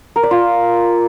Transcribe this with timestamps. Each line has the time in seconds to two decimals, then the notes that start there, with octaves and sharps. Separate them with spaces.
0.16 A#4
0.23 D5
0.31 F4